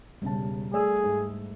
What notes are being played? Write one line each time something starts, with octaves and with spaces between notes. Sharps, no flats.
E1 C#3 G3 A5
A3 G#4 D5 E6
G#2